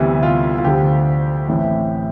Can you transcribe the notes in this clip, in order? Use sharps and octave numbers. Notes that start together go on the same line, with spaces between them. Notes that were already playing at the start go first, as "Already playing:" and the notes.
Already playing: D2 C3 E3 G3 B3
F4
F4
D2 D3 F3 G4
A1 A2 E3 A3 C4